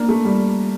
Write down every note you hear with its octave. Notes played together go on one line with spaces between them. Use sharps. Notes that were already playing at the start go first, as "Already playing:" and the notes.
Already playing: A#3 D4
A3
G3